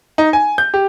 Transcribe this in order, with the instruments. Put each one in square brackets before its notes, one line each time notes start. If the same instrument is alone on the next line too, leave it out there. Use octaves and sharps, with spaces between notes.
[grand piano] D#4
G#5
G6
G4